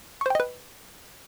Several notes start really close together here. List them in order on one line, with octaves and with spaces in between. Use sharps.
C#6 C5 G5 D#5 B4